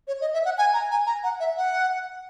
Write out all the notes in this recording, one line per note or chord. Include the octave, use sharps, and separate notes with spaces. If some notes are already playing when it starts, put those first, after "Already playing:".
C#5
D#5
E5
F#5
G#5
A#5
G#5
A#5
F#5
E5
F#5